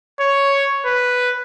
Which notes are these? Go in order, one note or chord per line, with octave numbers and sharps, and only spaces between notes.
C#5
B4